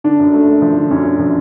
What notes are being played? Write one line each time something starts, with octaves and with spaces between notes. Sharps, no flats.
D3 D4
F#2
A3
A3
F3
D3
F#2 C#4
F#2
F3